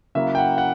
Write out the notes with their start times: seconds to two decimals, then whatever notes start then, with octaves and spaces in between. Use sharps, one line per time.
0.15 C#3 F#3 A#3 E4 E5
0.35 G5
0.38 F#5
0.58 F#5